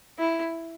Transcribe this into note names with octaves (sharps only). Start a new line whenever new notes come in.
E4